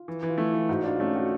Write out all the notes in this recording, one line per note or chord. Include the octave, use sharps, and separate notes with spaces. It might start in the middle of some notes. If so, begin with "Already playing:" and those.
Already playing: F4
E3
E3
F4
A3 E4
E3 F4
G#2 F#4
D4 F4
A3 C#4
F#4